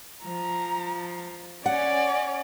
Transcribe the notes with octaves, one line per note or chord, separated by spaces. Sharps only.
F3 A#5
C#4 D5 F#5